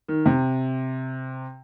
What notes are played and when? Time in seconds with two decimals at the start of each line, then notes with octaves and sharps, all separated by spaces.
0.08 D#3
0.26 C3